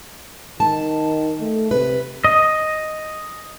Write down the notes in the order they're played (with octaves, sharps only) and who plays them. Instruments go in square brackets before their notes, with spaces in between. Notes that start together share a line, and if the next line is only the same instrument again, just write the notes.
[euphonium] D#3 [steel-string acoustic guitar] A5
[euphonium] A3
[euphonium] C3 [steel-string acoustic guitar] B4
[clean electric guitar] D#5